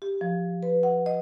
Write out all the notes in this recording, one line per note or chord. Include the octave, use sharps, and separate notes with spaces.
G4
F3
B4
F#5
D#5